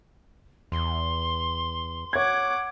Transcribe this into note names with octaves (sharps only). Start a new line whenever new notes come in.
E2 C6
C#5 F#5 D6 G#6